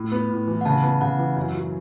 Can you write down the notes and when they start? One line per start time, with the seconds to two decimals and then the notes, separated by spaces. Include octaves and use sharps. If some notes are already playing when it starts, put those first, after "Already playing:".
Already playing: A2
0.12 B3
0.30 A2
0.47 E3
0.61 F#5
0.65 C#3 A5
0.83 B3
1.01 C#3 F#5
1.19 E3
1.36 F#2
1.54 F#3